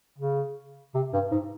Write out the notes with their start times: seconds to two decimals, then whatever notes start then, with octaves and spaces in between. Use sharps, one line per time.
0.18 C#3
0.95 C3
1.13 G2
1.31 G#2